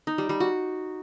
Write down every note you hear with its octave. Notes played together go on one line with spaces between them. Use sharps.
D#4
G3
G3
F#4